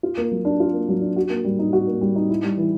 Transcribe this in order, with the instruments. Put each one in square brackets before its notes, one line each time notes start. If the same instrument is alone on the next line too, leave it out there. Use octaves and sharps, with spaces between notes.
[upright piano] F4
A#3
F#3
D4
F4
A#3
F#3
D4
F#4
A#3
G3
D#4
F#4
A#3
G3
D#4
E4
G3
E3